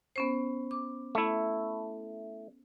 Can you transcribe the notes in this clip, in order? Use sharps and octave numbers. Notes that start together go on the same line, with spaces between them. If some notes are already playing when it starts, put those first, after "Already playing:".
B3 C#4 C5
D6
A3 E4